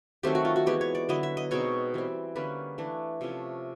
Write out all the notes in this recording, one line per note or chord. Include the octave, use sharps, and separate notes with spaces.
D#3 F#3 A3 C4 G4
F#4
F4
F#4
E3 G#3 B3 G4
C#5
D5
D3 F#3 B3 E4 D#5
E5
D#5
B2 G#3 C4 D#4 C#5
E3 G3 C4
D3 G3 A#3 C#4 B4
E3 A3 D4
C3 F3 A3 C#4